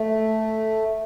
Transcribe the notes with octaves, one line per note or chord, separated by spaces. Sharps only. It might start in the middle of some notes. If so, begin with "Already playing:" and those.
Already playing: A3